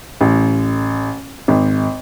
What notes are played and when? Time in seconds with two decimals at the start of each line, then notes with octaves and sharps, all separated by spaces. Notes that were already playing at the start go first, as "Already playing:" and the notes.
0.21 A1
1.48 G#1